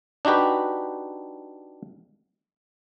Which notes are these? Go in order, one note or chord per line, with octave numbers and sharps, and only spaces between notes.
D4 D#4 F#4 G4 B4